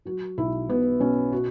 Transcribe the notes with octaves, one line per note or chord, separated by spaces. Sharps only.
F#3 F#4
B1 E4
B2 B3
B2 C#4
F#4